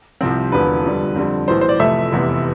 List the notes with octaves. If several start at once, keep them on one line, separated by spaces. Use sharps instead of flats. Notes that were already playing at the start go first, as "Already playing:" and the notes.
C2 C3 F3 C4
E1 E2 D3 F3 B4
G1 F2 D3 G3
F2 D3 G3 C4
B1 A2 E3 C5
C5
D5
F1 F2 C3 E3 A3 E5
F1 E2 C3 E3 B3